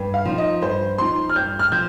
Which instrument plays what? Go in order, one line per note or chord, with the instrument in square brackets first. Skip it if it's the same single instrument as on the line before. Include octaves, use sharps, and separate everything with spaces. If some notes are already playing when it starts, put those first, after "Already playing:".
Already playing: [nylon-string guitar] G2
[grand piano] F5
[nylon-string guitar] F3 D#4
[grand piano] D#5
[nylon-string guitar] G2 [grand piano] C5
[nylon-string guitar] F3 D#4 [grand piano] C6
[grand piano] F6
[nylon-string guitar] G2 [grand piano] G6
[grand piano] F6
[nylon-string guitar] F3 [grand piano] G6